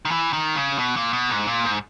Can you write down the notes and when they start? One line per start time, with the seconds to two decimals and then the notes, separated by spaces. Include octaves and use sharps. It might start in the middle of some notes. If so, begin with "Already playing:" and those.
0.05 D#3
0.11 E3
0.33 D#3
0.56 C#3
0.78 B2
0.97 A#2
1.13 B2
1.30 G#2
1.47 A#2
1.64 G#2